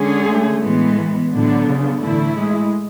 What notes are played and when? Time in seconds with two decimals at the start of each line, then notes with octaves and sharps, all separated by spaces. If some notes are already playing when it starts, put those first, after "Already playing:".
Already playing: D3 G#3 C#4 G#4
0.26 A3
0.62 A2 E3 G#3 B3
1.31 A2 D3 F#3 B3 D4
1.66 C#3
2.00 A2 D3 E3 A3 E4
2.35 G#3